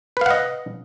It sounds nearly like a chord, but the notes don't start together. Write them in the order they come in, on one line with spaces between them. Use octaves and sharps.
B4 F5 F#5 D#5